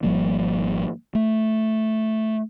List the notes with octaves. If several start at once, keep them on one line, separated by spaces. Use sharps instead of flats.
G#1 F3 G3 A#3
A3